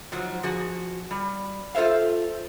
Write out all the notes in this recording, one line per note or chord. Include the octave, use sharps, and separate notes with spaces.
G#2 F3 F#3
F3 F#4 G#4
G3
F4 A4 C5 E5 F5